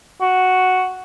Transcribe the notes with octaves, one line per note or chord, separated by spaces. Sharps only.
F#4